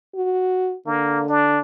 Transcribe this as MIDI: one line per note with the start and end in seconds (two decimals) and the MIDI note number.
0.15 0.75 66
0.87 1.60 50
0.87 1.28 58
1.29 1.59 62